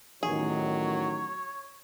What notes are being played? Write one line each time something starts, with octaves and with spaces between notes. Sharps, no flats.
A1 E2 D#3 F#3 G#4 C#5